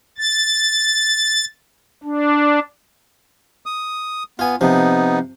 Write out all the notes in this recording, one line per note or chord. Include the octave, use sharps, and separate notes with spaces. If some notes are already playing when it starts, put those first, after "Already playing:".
A6
D4
D#6
B3 F4 G#5
C3 F3 B3 D#4